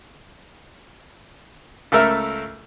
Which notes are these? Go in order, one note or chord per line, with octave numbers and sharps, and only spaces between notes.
C#2 A3 A4 A#4 E5